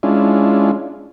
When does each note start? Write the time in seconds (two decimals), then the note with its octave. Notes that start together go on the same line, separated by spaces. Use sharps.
0.03 G#3 C#4 D4 E4 F4